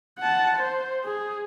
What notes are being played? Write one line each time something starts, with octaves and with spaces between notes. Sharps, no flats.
F#5 A5
C5
G#4